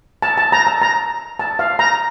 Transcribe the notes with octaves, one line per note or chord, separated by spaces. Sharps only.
A5
A5
A#5
A5
A#5
A5
F5
A#5